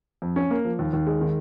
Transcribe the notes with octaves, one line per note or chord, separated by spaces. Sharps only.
F2
C#4
A#3
F3
D#2
D#2
G#3
D#3